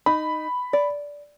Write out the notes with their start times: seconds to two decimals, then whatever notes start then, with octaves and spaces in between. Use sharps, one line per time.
0.06 D#4 B5
0.73 D5